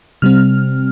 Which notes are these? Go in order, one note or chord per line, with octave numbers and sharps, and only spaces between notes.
C3 G3 C4 F6